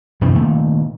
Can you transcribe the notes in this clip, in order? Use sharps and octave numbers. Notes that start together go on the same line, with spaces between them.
F#2 C3 E3 F3
A#2 D#3 A3